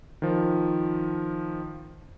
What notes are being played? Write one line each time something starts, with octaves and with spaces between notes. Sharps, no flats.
D#3 F3